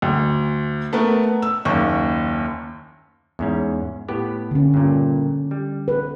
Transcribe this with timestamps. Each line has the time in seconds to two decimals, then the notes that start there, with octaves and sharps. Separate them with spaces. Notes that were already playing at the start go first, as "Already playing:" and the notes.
0.02 D2
0.93 A3 B3 A#4
1.42 E6
1.65 F#1 D#2 C#6
3.39 E2 G#2 C#4
4.09 A2 B3 G4
4.51 D3 C#4
4.74 G2 A#2
5.51 G3
5.88 B4